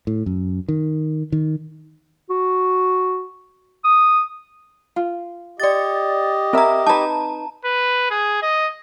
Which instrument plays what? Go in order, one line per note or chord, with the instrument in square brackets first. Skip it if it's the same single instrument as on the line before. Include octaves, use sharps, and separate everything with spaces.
[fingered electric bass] A2
F#2
D#3
D#3
[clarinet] F#4
D#6
[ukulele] F4
[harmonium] G4 D#5 [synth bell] D5 A6
[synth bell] C4 A#5 [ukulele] A#4 E5
[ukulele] D#4 B4 [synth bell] A5 A#5
[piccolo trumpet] B4
G#4
D#5